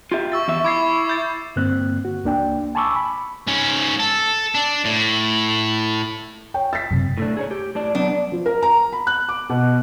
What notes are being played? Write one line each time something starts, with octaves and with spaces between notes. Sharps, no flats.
F4 G4 E5
C#6 E6 A6
E2 E5
E4 D6 G#6 C7
G6 A6
G2 D3 A#3 C4 F#6
F#4
C#2 A#3 D4 G5
G#5 A5 B5 C#6 D6 E6
B5
G#2 C#4
A4
D4
A2
C#5 G5
A6 B6
F#2 C3
A2 A3 D4
G#4 A4 C#5
G4
A2 D4 D5
F#3 B3 D4
F3
A#4
A#5
B5
F#6
D6
B2